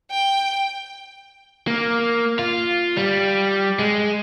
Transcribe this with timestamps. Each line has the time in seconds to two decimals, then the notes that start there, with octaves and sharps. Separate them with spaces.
0.11 G5
1.67 A#3
2.39 F4
2.97 G3
3.79 G#3